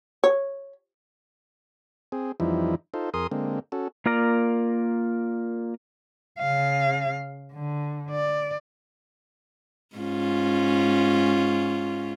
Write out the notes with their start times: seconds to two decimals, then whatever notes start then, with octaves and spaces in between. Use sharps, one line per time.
0.24 C#5
2.12 C4 G#4
2.40 F2 E3 F3 G3 D#4 E4
2.94 D#4 F4 A4 C5
3.14 F2 G#4 A#4 C6 D#6
3.31 D3 G#3 A#3 C4
3.72 C#4 F#4 A4
4.06 A#3 F4 A#4 D5 A#5
6.39 C#3 F5
7.53 D3
8.11 D5
9.96 G#2 C#4 F4